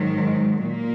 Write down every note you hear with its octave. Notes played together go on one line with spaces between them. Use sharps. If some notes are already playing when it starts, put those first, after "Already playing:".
Already playing: G#2 D#3 F#3
G#3
A#2 A#3